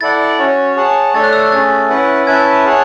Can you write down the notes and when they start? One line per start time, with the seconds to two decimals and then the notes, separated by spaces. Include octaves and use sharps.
0.01 E4 A4 D5 F#5 A6
0.39 C#4 F#4 C#5
0.76 G#4 C#5 F#5 A5
1.14 A3 D4 A4 C#5 A6
1.24 F#6
1.33 E6
1.43 F#6
1.52 A3 C#4 G#4 A6
1.89 C#4 E4 B4 F#5
2.27 C#4 E4 B4 E5 A5 G#6
2.65 G#4 C#5 F#5 A5